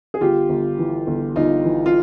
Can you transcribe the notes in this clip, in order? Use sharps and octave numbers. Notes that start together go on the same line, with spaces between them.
G#4
G1 F4 G4
G1
E3
G1
G1 D#4 F4
E3
F4